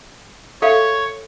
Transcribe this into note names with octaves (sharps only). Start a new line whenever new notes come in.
A4 C#5 E5 F5